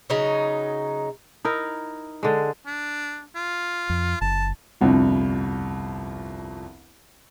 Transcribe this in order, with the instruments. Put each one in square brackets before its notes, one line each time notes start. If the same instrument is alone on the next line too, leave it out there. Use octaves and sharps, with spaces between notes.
[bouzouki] C#3 F#3 D#4
[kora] D#4 E4 A#4
D3 G#3
[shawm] D4
F4
[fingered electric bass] F2
[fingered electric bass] F#1 [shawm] A5
[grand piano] G1 C2 F2